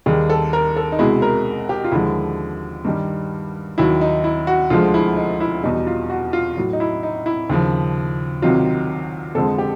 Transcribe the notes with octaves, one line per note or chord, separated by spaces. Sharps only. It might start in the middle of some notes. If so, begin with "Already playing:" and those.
D#2 D#3 G3 G#4
A4
A#4
A4
D#4
C2 B2 G#3 E4
A#4
G4
F4
D#2 D3 F3 G#3 E4
G2 D#3 G3
D#2 D#3 F#3 E4
D#4
E4
F#4
D2 D3 F3 G#3 F4
E4
D#4
E4
E2 B2 G3 D#4
F4
F#4
F4
A2 F#3
D#4
E4
D#4
E4
D#2 C#3 F3
C2 C3 D#3 F#3 F4
F2 D3 F3 G#3 A4
G4